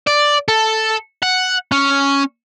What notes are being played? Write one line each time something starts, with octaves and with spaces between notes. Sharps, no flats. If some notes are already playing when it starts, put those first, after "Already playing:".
D5
A4
F#5
C#4